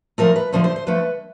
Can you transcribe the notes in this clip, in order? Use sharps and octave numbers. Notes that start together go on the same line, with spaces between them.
D3 F3 A3 A#4
B4
D3 F3 A3 C5
C5
C5
D3 F3 A3 B4